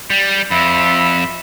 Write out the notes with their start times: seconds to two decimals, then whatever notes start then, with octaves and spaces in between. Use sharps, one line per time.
0.10 G3
0.51 F2 E5 B5 E6